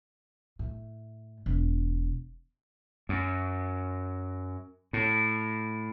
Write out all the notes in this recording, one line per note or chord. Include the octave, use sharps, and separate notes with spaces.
A2
E1
F#2
A2